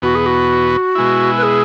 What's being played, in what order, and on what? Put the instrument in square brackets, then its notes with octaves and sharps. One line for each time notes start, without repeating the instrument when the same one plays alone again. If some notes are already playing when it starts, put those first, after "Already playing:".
[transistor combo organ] E2 B2 B3 [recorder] F#4
[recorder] G#4
F#4
[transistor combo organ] B2 G#3 E4
[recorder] B4
G#4